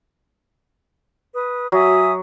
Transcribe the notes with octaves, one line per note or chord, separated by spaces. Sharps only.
B4 D#6
F#3 E5 G#5 D#6